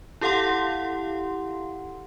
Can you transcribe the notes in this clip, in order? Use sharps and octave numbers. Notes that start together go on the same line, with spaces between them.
E4 G4 A4 F5 F#5 C6